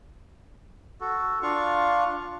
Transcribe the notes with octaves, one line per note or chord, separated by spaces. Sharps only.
F#4 A4
D4 F4 F5 C#6